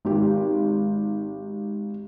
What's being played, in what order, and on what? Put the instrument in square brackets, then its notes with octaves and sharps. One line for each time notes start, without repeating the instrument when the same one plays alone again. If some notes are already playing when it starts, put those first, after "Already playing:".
[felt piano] G#1 G4